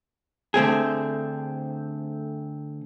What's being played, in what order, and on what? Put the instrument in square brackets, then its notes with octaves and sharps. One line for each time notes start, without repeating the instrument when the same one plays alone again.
[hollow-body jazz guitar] D3 A3 C4 G#4